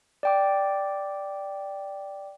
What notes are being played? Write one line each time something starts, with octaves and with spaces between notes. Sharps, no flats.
D5 G5 D6